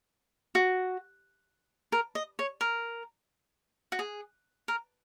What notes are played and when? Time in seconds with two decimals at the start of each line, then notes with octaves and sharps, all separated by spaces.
0.55 F#4
1.92 A#4
2.15 D#5
2.39 C#5
2.61 A#4
3.92 F#4
3.99 G#4
4.68 A#4